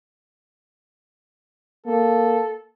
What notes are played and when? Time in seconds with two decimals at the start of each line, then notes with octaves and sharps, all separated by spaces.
1.86 A#3 A4